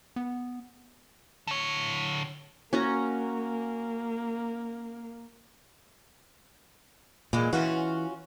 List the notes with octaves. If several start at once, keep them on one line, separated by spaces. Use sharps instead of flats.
B3
D3 C#5
A#3 C#4 F#4 A#5
A#2 E3 G#3
E3 C#4 F4 F#4